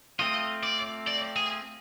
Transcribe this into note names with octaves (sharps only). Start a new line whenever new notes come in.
A3 C4 F4 D#5
D5
D5
G#4